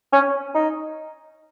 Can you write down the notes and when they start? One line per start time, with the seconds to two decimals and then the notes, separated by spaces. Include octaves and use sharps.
0.13 C#4
0.55 D#4